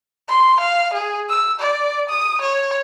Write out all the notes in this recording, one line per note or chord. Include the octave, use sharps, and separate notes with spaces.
C6
F5
G#4
E6
D5
D#6
C#5